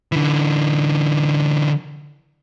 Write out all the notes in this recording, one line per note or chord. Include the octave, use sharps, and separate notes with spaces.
D3 E3